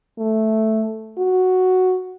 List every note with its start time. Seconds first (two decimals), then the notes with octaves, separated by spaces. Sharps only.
0.19 A3
1.18 F#4